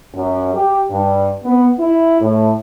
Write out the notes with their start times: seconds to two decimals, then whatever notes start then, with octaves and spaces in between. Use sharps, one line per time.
0.14 F#2
0.54 G4
0.90 G2
1.44 B3
1.79 E4
2.21 A2